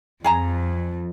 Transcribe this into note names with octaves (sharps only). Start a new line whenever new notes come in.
F2 G#4 G#5 A#5